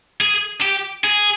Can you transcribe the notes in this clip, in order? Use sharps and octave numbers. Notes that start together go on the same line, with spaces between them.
G#4
G4
G#4